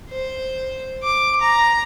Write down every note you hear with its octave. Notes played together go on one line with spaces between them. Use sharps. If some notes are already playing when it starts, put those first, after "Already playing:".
C5
D6
A#5